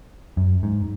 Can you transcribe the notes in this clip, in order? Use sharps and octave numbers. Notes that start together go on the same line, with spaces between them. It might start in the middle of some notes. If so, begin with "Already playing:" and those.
F#2
G#2